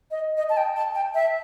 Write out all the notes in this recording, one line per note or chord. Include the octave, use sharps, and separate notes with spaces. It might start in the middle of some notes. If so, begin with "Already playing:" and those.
D#5
D#5
A5
G5
A5
G5
E5